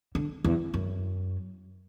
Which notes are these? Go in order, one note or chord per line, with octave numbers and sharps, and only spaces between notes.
D3
E2
F#2